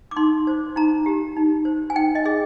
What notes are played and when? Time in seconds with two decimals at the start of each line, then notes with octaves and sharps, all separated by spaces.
0.11 D6
0.17 D#4 C6
0.47 C5
0.76 D#4 A#5
1.06 G4
1.37 D#4
1.65 C5
1.90 G#5
1.96 D#4 G5
2.15 D#5
2.25 G#4 D#5